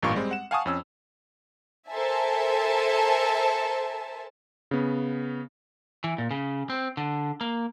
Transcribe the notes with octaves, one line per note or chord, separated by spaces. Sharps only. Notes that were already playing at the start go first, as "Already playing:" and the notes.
A1 G2 A#2 F5 C#6
G3 G#3 C4
F#5 E7
F5 F#5 G#5 A5 C#6 D#6
F2 C#4 E6
A4 A#4 C5 E5 G#5 A5
C#3 B3
E3
A#2
C#3
C4
D3
A#3